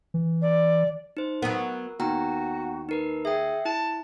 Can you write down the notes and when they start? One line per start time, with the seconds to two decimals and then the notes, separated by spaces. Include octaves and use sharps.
0.14 E3
0.42 D5
1.17 D#4 C5
1.42 F#3 B3 A#4
2.00 D#2 B3 F#4 G5 A#5
2.89 D#4 A#4 B4
3.25 G#4 E5 G5
3.65 E4 A5